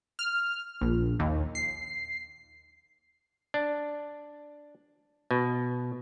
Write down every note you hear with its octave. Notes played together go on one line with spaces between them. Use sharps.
F6
A#1
D#2
C7
D4
B2